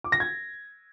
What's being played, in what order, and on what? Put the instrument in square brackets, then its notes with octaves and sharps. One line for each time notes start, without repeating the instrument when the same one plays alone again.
[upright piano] D6
A#6
G#6